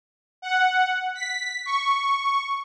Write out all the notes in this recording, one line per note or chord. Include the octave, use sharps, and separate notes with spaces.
F#5
B6
C#6